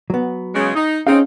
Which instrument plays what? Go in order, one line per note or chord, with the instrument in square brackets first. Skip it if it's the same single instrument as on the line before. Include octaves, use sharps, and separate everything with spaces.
[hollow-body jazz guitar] F#3 B3
[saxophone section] C#3 G#3
D#4
[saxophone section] C4 D#4 [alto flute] C#4 [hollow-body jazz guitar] G#4 F5